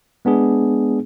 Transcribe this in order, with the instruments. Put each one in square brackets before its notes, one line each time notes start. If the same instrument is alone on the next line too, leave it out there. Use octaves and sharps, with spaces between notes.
[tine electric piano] G#3 B3 D4 G#4